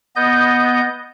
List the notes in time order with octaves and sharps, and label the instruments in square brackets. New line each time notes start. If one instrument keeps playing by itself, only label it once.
[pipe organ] B3 D#5 G6